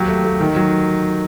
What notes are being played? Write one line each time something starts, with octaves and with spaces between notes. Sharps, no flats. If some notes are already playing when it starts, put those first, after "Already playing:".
Already playing: D#2 F#3 G4
A3
A3
D#3
F#3